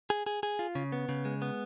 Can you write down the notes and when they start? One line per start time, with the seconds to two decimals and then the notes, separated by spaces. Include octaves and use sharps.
0.10 G#4
0.26 G#4
0.43 G#4
0.59 F4
0.75 C#3
0.92 B3
1.09 C#3
1.25 G#3
1.42 B3